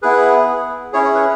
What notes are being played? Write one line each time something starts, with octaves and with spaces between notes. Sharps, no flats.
B3 E4 G#4 B4
C#4 E4 G#4 C#5
C#5
B4